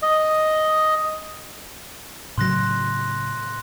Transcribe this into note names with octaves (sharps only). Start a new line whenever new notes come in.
D#5
A2 C#3 F#3 C6 F#6 A#6